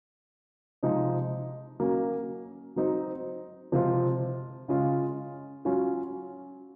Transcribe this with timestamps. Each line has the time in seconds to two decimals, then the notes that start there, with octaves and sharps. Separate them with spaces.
0.83 C3 F3 G#3 D#4
1.80 F#3 A#3 C#4
2.76 F#3 C4 D#4
3.72 C3 F3 G#3 C4 F4
4.68 C#3 G#3 C#4 F4
5.65 F#3 C#4 F4